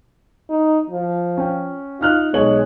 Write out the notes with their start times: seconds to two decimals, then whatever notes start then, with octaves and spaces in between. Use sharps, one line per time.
0.50 D#4
0.90 F3
1.37 C#4 G5
2.01 D#4 F4 F6 F#6
2.34 B1 G#3 C#5 F#7